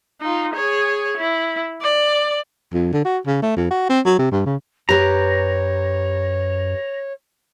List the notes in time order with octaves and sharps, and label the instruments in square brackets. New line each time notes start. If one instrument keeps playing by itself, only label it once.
[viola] D#4 F4
G#4 C#5
E4
D5
[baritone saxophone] F2
D3
F#4
C#3
A3
F2
F#4
C4
F#3
C3
G2
C#3
[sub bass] F#2 [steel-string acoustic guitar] G4 B4 [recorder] C#5 [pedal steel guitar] A#5